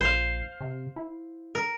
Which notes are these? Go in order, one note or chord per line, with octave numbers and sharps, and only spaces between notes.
A#1 C5 F5
C3
E4
A#4